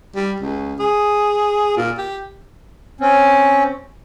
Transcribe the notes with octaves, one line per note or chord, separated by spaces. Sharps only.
G3
C#2
G#4
A#2
G4
C4 C#4